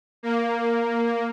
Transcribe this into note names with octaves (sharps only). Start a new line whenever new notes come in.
A#3